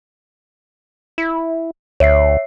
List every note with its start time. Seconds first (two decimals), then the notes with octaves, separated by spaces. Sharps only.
1.18 E4
2.00 D2 C#5 E5 C7